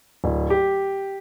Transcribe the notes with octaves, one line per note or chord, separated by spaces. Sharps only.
D1
G4